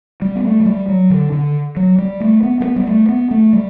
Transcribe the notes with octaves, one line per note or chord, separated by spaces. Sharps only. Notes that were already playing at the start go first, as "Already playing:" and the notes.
G3
B3
A3
F#3
G3
F#3
D3
D3
F#3
G3
A3
B3
A3
B3
G3
A3
B3
A3
G3